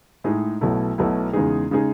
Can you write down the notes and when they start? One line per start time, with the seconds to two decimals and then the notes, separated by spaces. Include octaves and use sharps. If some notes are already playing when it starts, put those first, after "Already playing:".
0.24 A2 G#3 D#4 G#4
0.61 B1 B2 F#3 A3 E4
0.98 B1 B2 F#3 A3 E4
1.33 E2 C#3 G#3 D#4 G#4
1.71 C#3 G#3 D#4 G#4